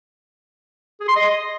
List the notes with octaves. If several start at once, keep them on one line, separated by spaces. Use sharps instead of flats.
G#4
C6
D#5